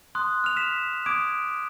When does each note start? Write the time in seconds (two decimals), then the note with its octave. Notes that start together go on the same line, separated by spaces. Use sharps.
0.15 C6 D#6 F#6
0.44 F6 F7
0.57 B6 E7
1.06 D6 D#6 G#6 D7